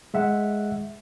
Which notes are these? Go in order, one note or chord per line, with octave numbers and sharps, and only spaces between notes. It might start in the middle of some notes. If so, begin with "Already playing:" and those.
G#3 E5 F#5